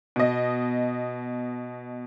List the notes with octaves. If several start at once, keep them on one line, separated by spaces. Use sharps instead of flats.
B2 D#5